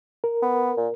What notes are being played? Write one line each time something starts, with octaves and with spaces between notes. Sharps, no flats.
A#4
B3
A#2